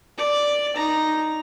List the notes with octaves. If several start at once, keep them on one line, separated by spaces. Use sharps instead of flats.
D5
D#4 A#5